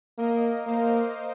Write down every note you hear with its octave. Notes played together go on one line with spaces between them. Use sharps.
A#3 A#4 D#5
A#3 C5 F5